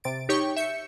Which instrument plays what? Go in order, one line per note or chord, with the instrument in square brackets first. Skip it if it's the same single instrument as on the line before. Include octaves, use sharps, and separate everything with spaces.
[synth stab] C3 A6 D7
D#4 G4 C#5 G5 C#6
E5 G6 C#7